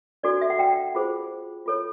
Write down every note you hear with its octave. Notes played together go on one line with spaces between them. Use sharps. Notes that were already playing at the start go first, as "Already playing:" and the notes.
D4 F#4 A4 D5
E5
F#5
G5
F4 G#4 C5
F4 A4 C#5